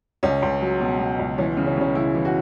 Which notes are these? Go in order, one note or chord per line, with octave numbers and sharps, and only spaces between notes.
C#2 C#4
C#2
F#3
B2
B2
C#2
E3 C#4
C#3
C#4
C#3 C#4
C#3 E4
E3
F#4